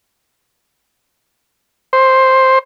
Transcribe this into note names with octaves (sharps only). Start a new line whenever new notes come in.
C5